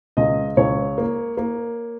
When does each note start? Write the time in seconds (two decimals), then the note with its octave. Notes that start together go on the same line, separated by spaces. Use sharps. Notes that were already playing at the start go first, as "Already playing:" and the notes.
0.17 C#2 D#5
0.57 C#2 C#5
0.98 A#3
1.37 A#3